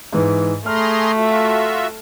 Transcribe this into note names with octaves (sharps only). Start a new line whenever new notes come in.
G#2 E3
A3 G#4 A#5 C6 F6
F4 F#4 E5